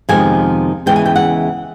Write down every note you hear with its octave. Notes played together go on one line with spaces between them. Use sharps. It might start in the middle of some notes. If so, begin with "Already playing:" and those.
F2 C3 D#3 G#3 B3 G#5
E2 C#3 E3 G#3 G5
G#5
G5
F#5